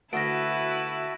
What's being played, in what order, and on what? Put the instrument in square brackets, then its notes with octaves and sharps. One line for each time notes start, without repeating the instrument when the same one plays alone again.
[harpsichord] D2 [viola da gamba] E4 B4 [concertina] F#4 E5 A5 [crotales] A#6 D7